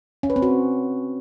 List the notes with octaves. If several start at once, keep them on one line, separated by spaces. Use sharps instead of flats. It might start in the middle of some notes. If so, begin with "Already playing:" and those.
C#4
B4
C4
F#4